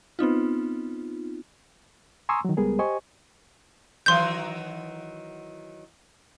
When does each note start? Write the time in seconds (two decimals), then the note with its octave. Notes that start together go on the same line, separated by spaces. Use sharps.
0.19 B3 C4 D#4 F4
2.29 G#5 A#5 C6 C#6 D#6 E6
2.45 D#3 F#3
2.57 C#2 G3 G#3 B3 G#4 A#4
2.79 G4 C5 D#5 G#5 C#6
4.06 D#3 E3 F#3 C6 G6